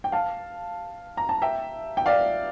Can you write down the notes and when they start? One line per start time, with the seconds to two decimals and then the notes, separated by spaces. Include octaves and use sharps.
0.04 G5
0.12 F5 A5
1.17 A#5
1.29 A5
1.42 E5 G5
1.97 G5
2.06 D5 F5